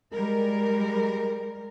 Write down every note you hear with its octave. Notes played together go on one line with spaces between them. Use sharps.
G3 G#3 A#4